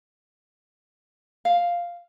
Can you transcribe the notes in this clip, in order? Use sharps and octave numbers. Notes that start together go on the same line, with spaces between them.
F5